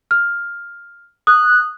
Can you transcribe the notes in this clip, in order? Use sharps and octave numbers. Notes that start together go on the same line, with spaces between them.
F6
D#6 F#6